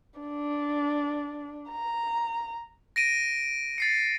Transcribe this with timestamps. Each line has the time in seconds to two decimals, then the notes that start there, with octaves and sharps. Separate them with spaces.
0.20 D4
1.71 A#5
2.96 A#6 D7 D#7
3.78 A6 C7 C#7